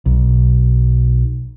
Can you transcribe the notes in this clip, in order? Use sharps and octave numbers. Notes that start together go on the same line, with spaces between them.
B1